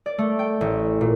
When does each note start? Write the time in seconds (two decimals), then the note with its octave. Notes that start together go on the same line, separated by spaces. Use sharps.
0.06 D5
0.18 A3
0.39 G5
0.61 A1
1.01 A#2